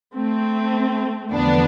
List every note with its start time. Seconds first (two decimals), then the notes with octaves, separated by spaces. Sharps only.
0.14 A3 C4
1.33 E2 D3 F3 B3 D4